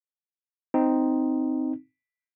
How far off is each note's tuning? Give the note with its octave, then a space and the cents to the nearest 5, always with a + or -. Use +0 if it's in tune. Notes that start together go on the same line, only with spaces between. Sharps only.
C4 -5 D#4 +0